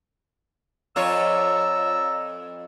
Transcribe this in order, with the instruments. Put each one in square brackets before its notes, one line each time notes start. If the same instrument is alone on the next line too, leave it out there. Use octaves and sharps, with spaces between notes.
[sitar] F2 F4 C#5 [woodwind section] D5 A#5 E6